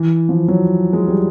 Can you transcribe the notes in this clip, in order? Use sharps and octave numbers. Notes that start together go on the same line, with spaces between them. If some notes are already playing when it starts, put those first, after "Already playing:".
Already playing: E3
F3
F#3
G#3
G3